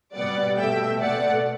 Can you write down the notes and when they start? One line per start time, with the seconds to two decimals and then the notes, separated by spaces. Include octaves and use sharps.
0.15 B2 G3 B3 D5 F#5
0.57 B2 A3 E5 G5
1.01 B2 A3 D5 F#5